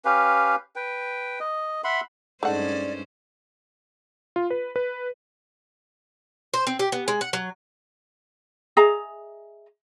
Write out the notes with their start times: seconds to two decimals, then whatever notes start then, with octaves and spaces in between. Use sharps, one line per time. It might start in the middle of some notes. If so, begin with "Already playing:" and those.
0.05 C#4 G4 B4 F5
0.76 B4 G5
1.40 D#5
1.84 E5 F#5 B5 C6
2.43 G2 G#3 A3 C#4 D#4 C5 D5 F#5
4.36 F4
4.50 B4
4.76 B4
6.54 C5
6.67 C4
6.79 G4
6.92 B3
7.08 G#3
7.21 F#5
7.33 F#3
8.77 G#4 D#5 E5 A#5